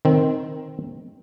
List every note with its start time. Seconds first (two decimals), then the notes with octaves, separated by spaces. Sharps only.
0.05 D#3 C4